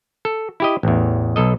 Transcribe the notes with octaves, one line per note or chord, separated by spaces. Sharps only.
A4
E4 G4 D#5
A1 E2
B1 A4 D#5